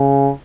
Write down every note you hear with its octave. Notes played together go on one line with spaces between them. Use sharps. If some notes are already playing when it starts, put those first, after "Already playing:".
Already playing: C#3